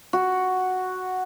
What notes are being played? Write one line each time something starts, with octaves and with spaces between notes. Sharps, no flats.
F#4